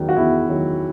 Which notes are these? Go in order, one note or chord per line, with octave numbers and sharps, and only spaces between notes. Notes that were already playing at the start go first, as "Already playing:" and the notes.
Already playing: E2 D#3 F#3
F#4
E2 E4
D#3 F#3